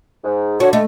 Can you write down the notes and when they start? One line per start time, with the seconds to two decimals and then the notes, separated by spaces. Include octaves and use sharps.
0.23 G#2
0.60 D3 F#4 C#5
0.73 A3 D#5